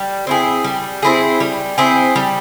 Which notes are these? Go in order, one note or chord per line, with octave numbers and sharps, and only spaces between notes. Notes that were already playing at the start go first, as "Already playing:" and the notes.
Already playing: G3
C4 E4 G#4
G3
C4 E4 G#4
G3
C4 E4 G#4
G3